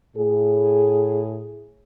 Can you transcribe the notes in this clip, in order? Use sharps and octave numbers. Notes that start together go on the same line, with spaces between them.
A2 G#4